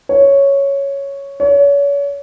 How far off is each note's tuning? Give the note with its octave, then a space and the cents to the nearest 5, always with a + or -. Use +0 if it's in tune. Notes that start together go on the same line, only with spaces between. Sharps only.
C#5 +0
C#5 +35